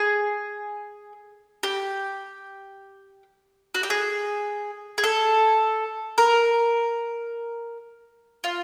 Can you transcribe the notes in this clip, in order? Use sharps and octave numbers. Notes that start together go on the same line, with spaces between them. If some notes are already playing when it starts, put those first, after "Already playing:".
Already playing: G#4
G4
F#4
G4
G#4
G#4
A4
A#4
F4